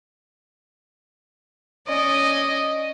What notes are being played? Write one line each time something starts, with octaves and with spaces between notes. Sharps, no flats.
C#4 D5 D#5